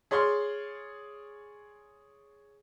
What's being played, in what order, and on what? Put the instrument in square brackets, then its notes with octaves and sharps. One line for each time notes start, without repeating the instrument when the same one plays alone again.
[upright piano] G#4 C#5 D5 C6 F6